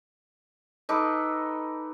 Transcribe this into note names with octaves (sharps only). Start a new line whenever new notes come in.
D#4 A4 B4 D6